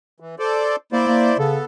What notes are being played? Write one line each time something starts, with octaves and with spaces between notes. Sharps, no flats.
E3
A4 C5 D5
A#3 E4 C5 D5
A#3
C#3 B3 A4